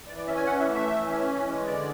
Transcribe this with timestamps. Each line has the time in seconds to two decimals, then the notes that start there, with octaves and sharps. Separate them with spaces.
0.07 E3 D5
0.17 D5
0.27 C#4 E5
0.37 G#5
0.46 E3 F#5
0.60 E5
0.67 A3
0.74 E5
0.87 E3
1.06 C#4
1.26 E3
1.45 G#3
1.66 D3 D5